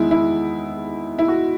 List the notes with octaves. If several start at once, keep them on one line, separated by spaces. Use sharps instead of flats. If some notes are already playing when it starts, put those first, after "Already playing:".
Already playing: E2 D#3 G#3 E4
E4
E4
F#4